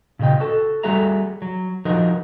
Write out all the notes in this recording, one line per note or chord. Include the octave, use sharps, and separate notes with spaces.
A#2 C#3 F#4 D#5 G5
F#4 A4
G3 A3 F#4 G#4 E5 A#5
F#3
F3 D#4 F#4 A#4 D#5